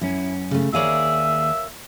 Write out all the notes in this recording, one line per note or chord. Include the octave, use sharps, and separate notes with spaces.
F#2 C#4 E4
C#3 A3
D#2 G#4 A#4 C#5 D5 E5 F5